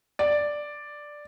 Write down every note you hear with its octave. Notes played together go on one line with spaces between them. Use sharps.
D5